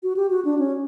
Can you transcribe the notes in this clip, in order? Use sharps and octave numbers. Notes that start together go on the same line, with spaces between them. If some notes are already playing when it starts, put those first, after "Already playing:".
F#4
G4
F#4
D4
C#4